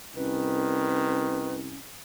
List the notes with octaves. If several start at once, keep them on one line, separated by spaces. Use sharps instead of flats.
C2 D#3 C#4 B4